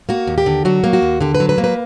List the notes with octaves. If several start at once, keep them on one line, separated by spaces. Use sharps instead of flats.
A#3 F#4
D#2
G4
D3
F#3 F#4
A#3
F#4
D#2
D3 G4
B4
F#3
B4
A#3
B4